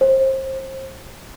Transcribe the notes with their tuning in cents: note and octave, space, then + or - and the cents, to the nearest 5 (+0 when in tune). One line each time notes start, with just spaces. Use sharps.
C5 +30